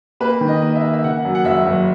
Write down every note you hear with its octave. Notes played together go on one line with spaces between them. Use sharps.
A#3 B4
D#3
D#5
A#3 D#5
E5
A#3
E5
C#3 F#5
F#2
F#5
F#1 E5
F#1